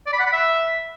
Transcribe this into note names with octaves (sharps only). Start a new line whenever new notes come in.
D5
B5
F#5
B5
E5